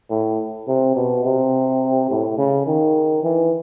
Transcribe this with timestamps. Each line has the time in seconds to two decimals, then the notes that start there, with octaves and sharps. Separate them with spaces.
0.10 A2
0.68 C3
0.96 B2
1.24 C3
2.10 A2
2.38 C#3
2.66 D#3
3.23 E3